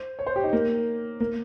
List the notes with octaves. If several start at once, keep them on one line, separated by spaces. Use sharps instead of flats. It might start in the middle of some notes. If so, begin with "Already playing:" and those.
Already playing: C5
C#5
C5
G4
D#4
A#3
A#3